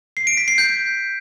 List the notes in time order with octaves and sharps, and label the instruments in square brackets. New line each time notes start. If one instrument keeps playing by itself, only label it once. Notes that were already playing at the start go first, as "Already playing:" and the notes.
[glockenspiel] C7
D7
B6
C7
G6